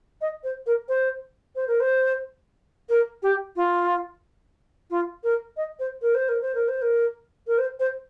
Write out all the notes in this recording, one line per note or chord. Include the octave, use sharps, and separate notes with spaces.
D#5
C5
A#4
C5
C5
A#4
C5
A#4
G4
F4
F4
A#4
D#5
C5
A#4
C5
A#4
C5
A#4
C5
A#4
A#4
C5
C5